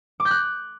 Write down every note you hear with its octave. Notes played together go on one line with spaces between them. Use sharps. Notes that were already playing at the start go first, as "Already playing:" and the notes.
D6
G6
F#6